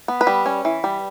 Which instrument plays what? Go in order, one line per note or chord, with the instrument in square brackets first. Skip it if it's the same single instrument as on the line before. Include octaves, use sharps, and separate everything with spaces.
[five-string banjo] B3
B4
G3
C#4
E3
G3